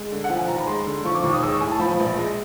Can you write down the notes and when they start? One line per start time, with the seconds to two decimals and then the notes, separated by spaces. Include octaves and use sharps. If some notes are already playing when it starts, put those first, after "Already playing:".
Already playing: G#3
0.11 D3
0.24 F#5
0.29 F3 G5
0.38 G#5
0.48 D#2 A#5
0.58 B5
0.67 G#3 C6
0.86 D3
1.05 F3 C#6
1.15 D6
1.23 D#2 C#6
1.33 D#6
1.42 G#3 E6
1.52 C#6
1.61 A2 G#5
1.71 A5
1.80 F3 B5
1.99 A#1
2.18 G#3